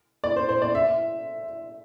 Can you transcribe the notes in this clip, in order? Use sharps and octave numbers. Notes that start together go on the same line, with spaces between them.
D5
C5
C5
D5
E5